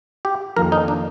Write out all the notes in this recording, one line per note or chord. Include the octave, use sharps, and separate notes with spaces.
G4
F2 D#3 A#3 F4 A4 A#4
D#4
D4